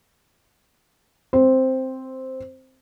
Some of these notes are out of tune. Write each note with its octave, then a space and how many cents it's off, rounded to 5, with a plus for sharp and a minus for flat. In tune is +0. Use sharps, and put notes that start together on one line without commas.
C4 +0 C5 +0